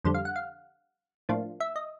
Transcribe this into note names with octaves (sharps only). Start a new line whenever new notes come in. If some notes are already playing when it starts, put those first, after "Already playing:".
F2 D3 G3 C5
F5
F#5
F5
A2 F3 A#3 D4 F4
E5
D#5